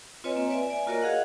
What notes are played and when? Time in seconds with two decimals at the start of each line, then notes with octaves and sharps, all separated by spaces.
0.24 C4 F4 B4 C#5 D#5 G#5
0.36 A#3 C4
0.50 B4 D5 E5 G#5
0.70 D5 G#5
0.86 A#3 F4 F#4 A#4 C#5 D#5
1.02 F#4 G#4 D#5 F5 F#5